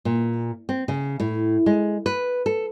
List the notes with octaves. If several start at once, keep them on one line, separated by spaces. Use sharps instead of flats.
A#2
C4
C#3
A2
G#3
B4
A4